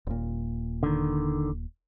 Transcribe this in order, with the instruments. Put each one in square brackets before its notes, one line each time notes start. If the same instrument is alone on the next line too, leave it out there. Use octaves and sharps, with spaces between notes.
[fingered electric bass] D#1 A#2
[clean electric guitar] D3 D#3